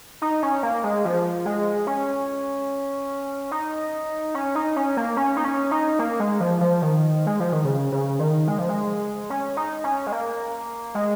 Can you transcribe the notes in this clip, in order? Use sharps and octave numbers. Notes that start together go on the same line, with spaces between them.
D#4
C#4
A#3
G#3
F3
G#3
C#4
D#4
C#4
D#4
C#4
A#3
C#4
D#4
C#4
D#4
A#3
G#3
F3
F3
D#3
G#3
F3
D#3
C#3
C#3
D#3
G#3
F3
G#3
C#4
D#4
C#4
G#3
A#3
G#3